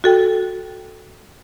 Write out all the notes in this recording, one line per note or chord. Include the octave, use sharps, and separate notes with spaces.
F#4 A4 G5